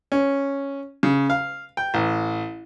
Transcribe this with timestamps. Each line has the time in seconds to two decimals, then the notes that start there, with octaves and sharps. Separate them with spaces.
0.12 C#4
1.03 C#3
1.30 F5
1.77 G5
1.94 A1